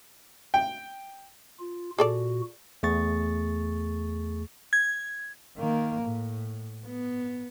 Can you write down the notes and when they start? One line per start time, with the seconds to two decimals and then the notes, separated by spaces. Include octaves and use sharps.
0.54 G5
1.60 F4
1.98 A#2 F#4 G#4 A4 D5
2.83 E2 A3 G#4 C#6 A6
4.73 G#6
5.57 D#3 A#3
6.02 A2
6.87 B3